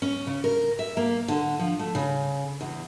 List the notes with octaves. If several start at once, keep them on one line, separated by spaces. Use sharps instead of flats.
C#4
C#3
A#4
E5
A#3
D3
F3
A3
C#3
E2